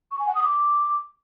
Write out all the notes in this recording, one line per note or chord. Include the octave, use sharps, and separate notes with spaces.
C#6
G#5
F#5
D#6
D6